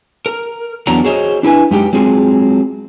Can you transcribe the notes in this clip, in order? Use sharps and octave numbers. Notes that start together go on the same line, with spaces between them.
A#4
E2 F#3 B3 D4 F#5 A#5
F#4 G#4 C5 C#5 D#5
D4 E4 B4 G#5
F#2 G#3 D#4 G4 G5
F#3 G#3 C4 F4 G#4